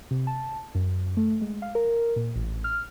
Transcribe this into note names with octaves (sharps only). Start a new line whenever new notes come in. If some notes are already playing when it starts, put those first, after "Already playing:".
C3
A5
F#2
A3
G#3
F5
A#4
A#2
A1
F6